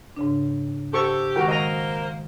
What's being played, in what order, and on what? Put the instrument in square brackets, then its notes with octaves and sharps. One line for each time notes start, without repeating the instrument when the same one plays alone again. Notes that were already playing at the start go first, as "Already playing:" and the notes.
[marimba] G#2 C#3 D4
[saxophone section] G4 [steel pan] A4 C#6 [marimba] C5
[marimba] D#3 G#3 [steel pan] F#4 A#4 G5
[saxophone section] A#3 A#4 C5 [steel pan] D#5 A#5